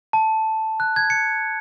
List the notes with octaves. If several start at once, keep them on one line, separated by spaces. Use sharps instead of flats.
A5
F#6
G#6
C#7